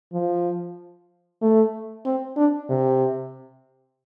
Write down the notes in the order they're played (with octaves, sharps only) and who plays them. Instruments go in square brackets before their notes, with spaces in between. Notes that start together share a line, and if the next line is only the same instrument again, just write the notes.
[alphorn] F3
A3
C4
D4
C3